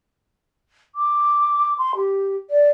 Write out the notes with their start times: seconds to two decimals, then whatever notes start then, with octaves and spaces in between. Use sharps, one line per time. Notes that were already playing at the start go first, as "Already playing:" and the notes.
0.95 D6
1.78 C6
1.96 G4
2.50 D5